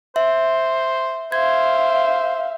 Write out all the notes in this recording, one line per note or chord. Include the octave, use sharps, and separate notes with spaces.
C5 E5
C5 E5 F5 G#6